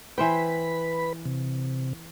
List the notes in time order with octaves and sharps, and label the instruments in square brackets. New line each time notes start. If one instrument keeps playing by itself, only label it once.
[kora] E3 C5 G5 [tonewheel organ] B4 B5
[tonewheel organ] C3